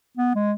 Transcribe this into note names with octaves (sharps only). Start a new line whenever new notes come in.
B3
G#3